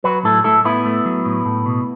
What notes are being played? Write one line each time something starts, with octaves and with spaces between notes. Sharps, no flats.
F#3 F#4 B4
A2 E4 A4
A2 E4 A4
A2 B3 E4
A3
F#3
A2
A2
B2